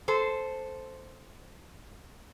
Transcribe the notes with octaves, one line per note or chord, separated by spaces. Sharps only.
A4 C5